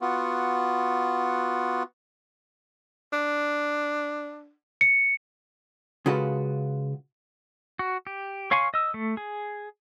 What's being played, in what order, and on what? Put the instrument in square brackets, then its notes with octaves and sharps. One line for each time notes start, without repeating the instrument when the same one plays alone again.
[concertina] B3 F4 F#4
[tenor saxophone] D4
[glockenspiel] C#7
[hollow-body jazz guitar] C#3 G#3 F4 F#4 A4 B4
[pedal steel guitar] F#4
G4
C#5 F5 G#5 C6 C#6
D#5 E6
A3
G#4